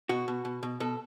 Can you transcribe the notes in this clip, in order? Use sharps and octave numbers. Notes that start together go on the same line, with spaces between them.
B2 F#4
B2
B2
B2
B2 A4